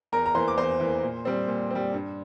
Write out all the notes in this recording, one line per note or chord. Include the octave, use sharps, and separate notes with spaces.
E2 A#4 A#5
A#5
E3 A#3 C5 C6
D6
E2 C5 C6
E3 A#3
A#2
G3 C4
A#2
G3 C4
G2